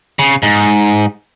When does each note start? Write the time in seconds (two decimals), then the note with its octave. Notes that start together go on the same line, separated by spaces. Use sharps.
0.19 C#3
0.43 G#2